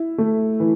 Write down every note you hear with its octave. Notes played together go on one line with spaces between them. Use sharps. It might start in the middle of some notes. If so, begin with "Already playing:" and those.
Already playing: E4
A3
E3